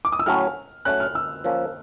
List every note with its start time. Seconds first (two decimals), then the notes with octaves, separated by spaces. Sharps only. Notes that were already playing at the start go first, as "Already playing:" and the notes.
0.05 D6
0.12 D#6
0.19 E6
0.26 A2 F#3 A3 C#4 F6
0.85 F#3 A3 C#4 F#6
1.00 F6
1.15 E6
1.44 F3 A#3 C#4